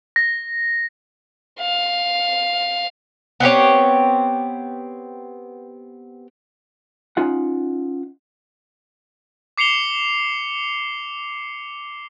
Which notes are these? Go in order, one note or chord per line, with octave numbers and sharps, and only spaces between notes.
A#6
F5
B3 C4 G4 C#5
C#4 D#4 F4 F#5
D6 C7 C#7 F7 G7